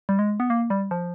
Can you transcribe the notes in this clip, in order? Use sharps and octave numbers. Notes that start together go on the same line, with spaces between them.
G3
G#3
B3
A#3
G3
F3